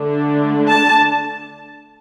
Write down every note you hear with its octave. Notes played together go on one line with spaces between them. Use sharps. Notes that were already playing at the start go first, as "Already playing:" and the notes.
Already playing: D3 A3 D4
A5